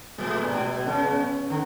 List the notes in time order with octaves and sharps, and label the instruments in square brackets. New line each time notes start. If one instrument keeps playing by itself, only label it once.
[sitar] A2 [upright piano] G#3
[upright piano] A3
B3
[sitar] A2 [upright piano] D4
[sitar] B2
[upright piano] B3
[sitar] C#3 [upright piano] C#4
[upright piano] B3
C#4
[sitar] D3